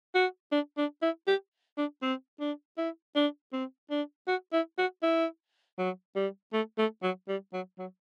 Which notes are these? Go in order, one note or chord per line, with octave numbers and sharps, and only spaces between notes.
F#4
D4
D4
E4
G4
D4
C4
D4
E4
D4
C4
D4
F#4
E4
F#4
E4
F#3
G3
A3
A3
F#3
G3
F#3
F#3